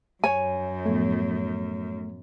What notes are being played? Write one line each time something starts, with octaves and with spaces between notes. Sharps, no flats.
F#2 C#5 G#5
A2 F3 A3 B3